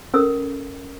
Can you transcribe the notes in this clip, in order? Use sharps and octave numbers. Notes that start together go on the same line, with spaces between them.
C#4 A4 A#4 E6